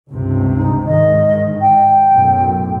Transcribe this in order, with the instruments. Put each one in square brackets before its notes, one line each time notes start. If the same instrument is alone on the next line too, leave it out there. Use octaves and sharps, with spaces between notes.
[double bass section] C#2 G2 C3
[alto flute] D#4
[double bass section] G#2 D#3 [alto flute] D#5
[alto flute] G5
[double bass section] B1 F#2 A2